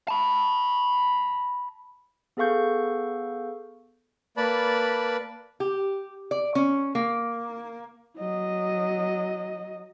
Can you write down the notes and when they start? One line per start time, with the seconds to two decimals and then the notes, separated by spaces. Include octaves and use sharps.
0.08 A5 B5
2.37 B3 G#4 A4 F5 C#6 G6
4.37 A#3 B4 D5 A5 B5
5.60 G4
6.31 D5
6.55 C#4
6.95 A#3
8.18 F#3 D#5